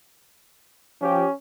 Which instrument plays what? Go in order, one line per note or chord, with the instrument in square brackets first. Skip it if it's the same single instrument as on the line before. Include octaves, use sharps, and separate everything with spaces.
[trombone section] F3 G4 [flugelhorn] C#4